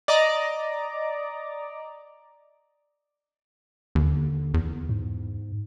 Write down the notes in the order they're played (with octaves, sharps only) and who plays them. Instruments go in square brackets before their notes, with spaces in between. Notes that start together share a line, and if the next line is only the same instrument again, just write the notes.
[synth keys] D5 D#5 A#5 D6
[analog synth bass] D#2 [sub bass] D3
[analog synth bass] E2
[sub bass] G#2